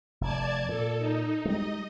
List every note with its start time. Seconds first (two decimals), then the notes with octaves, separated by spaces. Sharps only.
0.21 F1 D5 A5 G#6
0.69 A#2 A4
0.98 D#4
1.45 G3 G#3 D#5